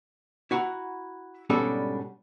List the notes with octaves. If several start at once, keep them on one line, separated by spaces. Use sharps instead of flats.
E4 F#4 F#5 A#5
G#2 B2 G3 C#4 D4 A4